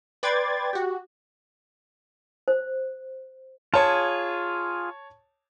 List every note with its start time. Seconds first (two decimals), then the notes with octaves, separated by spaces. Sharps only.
0.23 B4 D5 G5 C6 G#6 A6
0.73 F#4 G4
2.48 C5
3.74 F4 G#4 C#5 A5